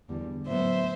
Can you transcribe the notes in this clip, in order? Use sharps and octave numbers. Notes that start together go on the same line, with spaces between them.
E2 D3 G3
A2 F#3 B3 C5 E5